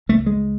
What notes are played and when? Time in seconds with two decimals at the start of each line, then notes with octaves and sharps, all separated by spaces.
0.09 C#2 A3
0.26 G#3